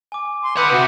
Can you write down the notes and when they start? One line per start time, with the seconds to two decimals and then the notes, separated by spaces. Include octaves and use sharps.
0.12 G#5 D6
0.43 C6
0.57 A4 B4 F#5 D6 D#6 G6
0.72 C3 F#4